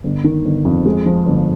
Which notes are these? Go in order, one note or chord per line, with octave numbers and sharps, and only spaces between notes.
G1
D#3
G1
F2
G#3
F3
G1